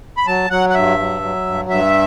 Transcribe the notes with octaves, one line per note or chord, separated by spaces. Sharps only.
B5
F#3 A5
F#3 F#5
F#5
G2 E5
F#3
F#3
G2
G2 E5